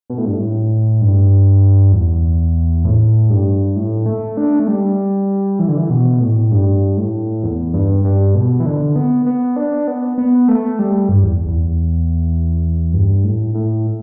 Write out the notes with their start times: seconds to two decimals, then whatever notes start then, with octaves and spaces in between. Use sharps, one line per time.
0.10 B2
0.18 A2
0.25 G2
0.34 A2
1.01 G2
1.93 E2
2.85 A2
3.30 G2
3.76 A2
4.06 A3
4.37 D4
4.60 A3
4.68 G3
5.59 E3
5.68 D3
5.77 E3
5.90 B2
6.20 A2
6.51 G2
6.97 A2
7.43 E2
7.74 G2
8.05 G2
8.35 B2
8.60 E3
8.66 D3
8.96 B3
9.26 B3
9.56 D4
9.88 B3
10.18 B3
10.48 A3
10.79 G3
11.09 G2
11.22 E2
11.46 E2
12.93 G2
13.24 A2
13.54 A2